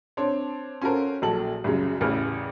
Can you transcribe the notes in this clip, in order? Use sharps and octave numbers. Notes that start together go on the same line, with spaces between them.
C4 D4 C#5
C#4 F4 F#4 A4 A#4 C5
A#1 A#2 F#3 A4 F#7
C2 F#2 C#3 F#3
A1 E2 C#3 E4 F6